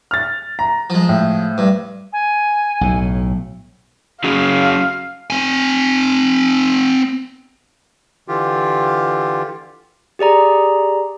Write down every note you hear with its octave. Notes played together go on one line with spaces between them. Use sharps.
F6 A6
A#5
F3 G#3
A2
G2
G#5
B1 A2
F#3 C#4 G#4 F5
C4 G#5
D3 E3 F4 G4
G4 G#4 D5 A#5